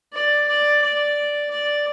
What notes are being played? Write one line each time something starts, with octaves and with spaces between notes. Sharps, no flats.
D5
D5
D5
D5